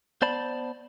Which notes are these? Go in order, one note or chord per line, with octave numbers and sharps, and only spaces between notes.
B3 C5 D5 A5 B5